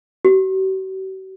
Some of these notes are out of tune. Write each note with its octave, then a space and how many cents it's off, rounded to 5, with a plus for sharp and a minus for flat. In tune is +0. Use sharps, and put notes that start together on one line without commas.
F#4 +45